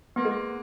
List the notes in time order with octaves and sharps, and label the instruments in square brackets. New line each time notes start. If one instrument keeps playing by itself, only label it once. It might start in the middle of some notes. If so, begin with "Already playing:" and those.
[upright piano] A#3 [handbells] B3
[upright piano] G#3
A#3